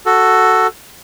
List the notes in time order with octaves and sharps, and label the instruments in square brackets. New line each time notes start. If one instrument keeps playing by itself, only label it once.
[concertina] F#4 A4